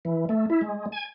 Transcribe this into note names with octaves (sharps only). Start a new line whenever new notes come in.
E3
A3
E4
G#3
G#5